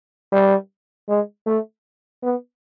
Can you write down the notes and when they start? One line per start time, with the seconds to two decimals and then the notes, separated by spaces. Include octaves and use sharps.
0.32 G3
1.09 G#3
1.47 A3
2.23 B3